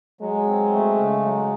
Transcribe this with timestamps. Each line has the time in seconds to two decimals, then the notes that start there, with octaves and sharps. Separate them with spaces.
0.21 F#3 G#3
0.47 C4
0.73 A3
0.99 C#3
1.24 F#3